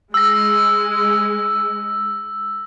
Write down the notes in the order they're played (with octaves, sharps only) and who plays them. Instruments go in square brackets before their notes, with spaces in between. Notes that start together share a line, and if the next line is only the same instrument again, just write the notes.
[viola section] G#3 [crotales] E6 A#6